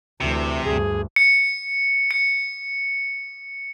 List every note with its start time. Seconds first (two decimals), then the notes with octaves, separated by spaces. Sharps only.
0.20 D2 C3 E3
0.65 D2 G2 G#4
1.16 C#7
2.11 C#7